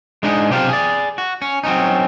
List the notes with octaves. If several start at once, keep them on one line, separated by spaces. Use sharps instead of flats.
G#3 D4 D#4 G#4
B1 C3 G4 C5 F5
G#4 D5
F#4
C#4
F#3 C4 C#4 D#4